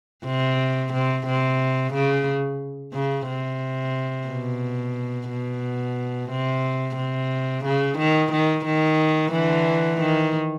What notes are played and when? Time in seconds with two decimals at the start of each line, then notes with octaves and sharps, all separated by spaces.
0.25 C3
0.93 C3
1.26 C3
1.93 C#3
2.93 C#3
3.28 C3
4.28 B2
5.29 B2
6.31 C3
6.97 C3
7.65 C#3
7.98 D#3
8.32 D#3
8.66 D#3
9.32 D3 E3
10.00 D#3